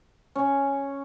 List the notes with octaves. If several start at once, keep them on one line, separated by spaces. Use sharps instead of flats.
C#4